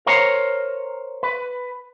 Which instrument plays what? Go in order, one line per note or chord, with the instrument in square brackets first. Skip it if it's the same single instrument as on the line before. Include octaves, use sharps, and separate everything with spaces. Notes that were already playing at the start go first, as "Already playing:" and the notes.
[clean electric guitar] A#4 C5 C#5 A#5
B4